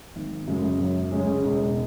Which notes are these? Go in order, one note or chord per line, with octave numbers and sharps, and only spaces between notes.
G#1
F#2 C#3 G#3
F#2
C#3 G#3 C#4 G#4
E1